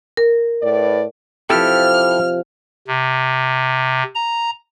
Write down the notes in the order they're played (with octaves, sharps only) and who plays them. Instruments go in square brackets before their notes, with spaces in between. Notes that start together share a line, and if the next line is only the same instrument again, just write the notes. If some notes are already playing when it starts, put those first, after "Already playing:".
[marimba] A#4
[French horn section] A2 B4 D5
[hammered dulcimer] C3 F3 [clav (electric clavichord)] E4 G4 A4 [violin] F6
[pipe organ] C3
A#5